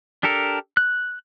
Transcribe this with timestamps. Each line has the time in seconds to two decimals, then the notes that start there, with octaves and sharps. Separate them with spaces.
0.23 D4 G4 A4 A#4
0.77 F#6